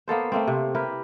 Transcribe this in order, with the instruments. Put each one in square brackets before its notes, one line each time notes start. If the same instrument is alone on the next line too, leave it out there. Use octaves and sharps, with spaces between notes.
[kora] A#3 B3 A4 C5
A3 A#3 C4
C3
E4 G4 A#4 B4